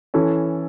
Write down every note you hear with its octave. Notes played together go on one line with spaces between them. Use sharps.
E3 C#4 A4